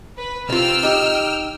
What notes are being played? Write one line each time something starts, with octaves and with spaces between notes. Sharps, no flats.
B4
C3 F4 G5 E6 F6
D#4 G4